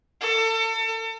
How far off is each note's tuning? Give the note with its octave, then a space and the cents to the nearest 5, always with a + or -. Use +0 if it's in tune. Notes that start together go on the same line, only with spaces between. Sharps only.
A4 +35